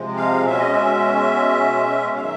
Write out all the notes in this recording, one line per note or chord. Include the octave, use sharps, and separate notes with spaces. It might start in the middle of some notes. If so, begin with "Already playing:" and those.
Already playing: C3 F3 G#3
F5
B2 G#3 C#4 E5
D#5
E5
F5
D#3 F#3 E5